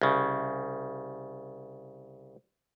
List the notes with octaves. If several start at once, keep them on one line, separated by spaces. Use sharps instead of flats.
C2 C#3